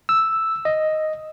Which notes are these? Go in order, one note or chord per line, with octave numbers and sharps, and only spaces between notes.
E6
D#5